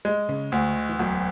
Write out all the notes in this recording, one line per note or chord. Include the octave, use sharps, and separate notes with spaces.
G#3
C#3
D2 D3
E3
E1 F#3